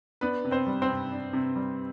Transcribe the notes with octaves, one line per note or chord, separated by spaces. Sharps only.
B3 D4 B4
C3
C4 C5
G3
C4 C5
C3
D4
C3
G3